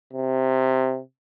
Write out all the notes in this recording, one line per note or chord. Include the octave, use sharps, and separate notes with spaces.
C3